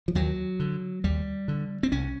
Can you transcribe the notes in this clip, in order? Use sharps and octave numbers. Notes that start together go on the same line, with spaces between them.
F3
D#2 F#3
D3
D#2 G3
D3
C4
C2 C#4